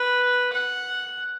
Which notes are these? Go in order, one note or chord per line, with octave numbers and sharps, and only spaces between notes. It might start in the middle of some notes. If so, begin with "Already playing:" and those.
Already playing: B4
F#5